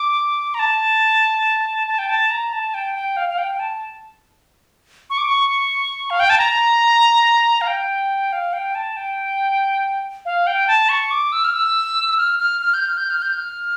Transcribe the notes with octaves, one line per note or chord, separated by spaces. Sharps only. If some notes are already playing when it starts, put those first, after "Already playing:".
Already playing: D6
A#5
A5
A5
G5
A5
A#5
A5
G5
G5
F5
F5
G5
A5
C#6
D6
C#6
F5
G5
A5
A#5
F5
G5
F5
G5
A5
G5
F5
G5
A5
C#6
D6
E6
F6
E6
E6
F6
F6
F6
G6
F6
G6
F6
G6
F6